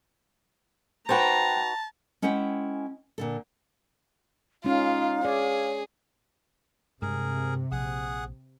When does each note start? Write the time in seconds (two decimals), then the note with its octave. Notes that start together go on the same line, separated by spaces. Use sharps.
1.09 D#4 F#4 B4 C5 G5 A5 A#5
2.22 G#3 C#4 E4 C5 F#5 G5
3.18 A#2 D3 A4
4.64 G#3 C#4 D#4 F4 F5
5.25 G#4 C#5 D5
7.02 G2 C3 G#3 G#4 A#4
7.72 A#1 G#4 F#5 D#6